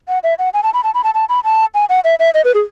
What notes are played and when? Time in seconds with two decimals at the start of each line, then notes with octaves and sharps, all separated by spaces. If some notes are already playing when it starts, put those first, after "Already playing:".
0.08 F#5
0.24 E5
0.39 F#5
0.54 G#5
0.63 A5
0.74 B5
0.84 A5
0.94 B5
1.04 A5
1.14 A5
1.29 B5
1.44 A5
1.75 G#5
1.89 F#5
2.04 E5
2.20 E5
2.34 D#5
2.45 B4
2.55 G#4